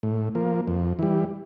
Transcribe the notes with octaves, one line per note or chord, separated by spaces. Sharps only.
A2
F3 A#3
F2
E3 G3